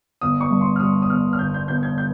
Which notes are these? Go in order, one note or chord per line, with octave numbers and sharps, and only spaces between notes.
G1 D#6
C#6
G2
C6
F6
G3 D#6
D#6
G1 F6
F6
G1 G6
G6
G1 G6
G#6
G6